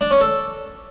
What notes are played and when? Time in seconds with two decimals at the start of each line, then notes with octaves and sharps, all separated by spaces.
0.01 D4
0.11 C#4
0.21 A4